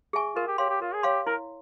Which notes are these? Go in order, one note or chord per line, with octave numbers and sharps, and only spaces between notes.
G#4 E5 G#5 C#6
F4 A#4
G4
G4 C#5 F5 C6
G4
F4 A#4
G#4
G4 C#5 F5 C6
E4 A#4